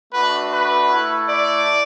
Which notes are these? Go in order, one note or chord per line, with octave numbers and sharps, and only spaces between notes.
A3 D4 F#4 B4
B4
A3 E4
D5